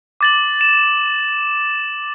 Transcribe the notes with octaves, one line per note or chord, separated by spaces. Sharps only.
D6 A6 F#7
E7